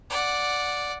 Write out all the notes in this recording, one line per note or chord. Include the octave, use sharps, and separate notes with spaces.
D5 F#5